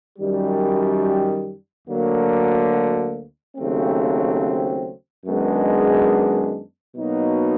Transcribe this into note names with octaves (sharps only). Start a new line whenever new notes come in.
F#2 D#3 G3
D2 D3 F#3 A#3
D#2 C#3 F#3 A3 C4
F#2 D#3 G#3 B3 D4
B2 F#3 A#3 D#4